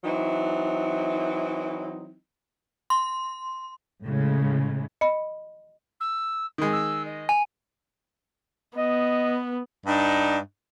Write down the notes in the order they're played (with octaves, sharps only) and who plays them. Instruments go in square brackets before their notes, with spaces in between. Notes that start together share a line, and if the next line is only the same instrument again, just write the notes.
[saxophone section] E3 F#3 C4 D#4 E4
[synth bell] C6
[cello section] A2 C#3 G#3
[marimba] D#5 B5
[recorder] E6
[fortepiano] D#3 G#3
[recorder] E6
D#5
[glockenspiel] G#5
[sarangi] B3 [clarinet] D#5
[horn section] G2 D4 D#4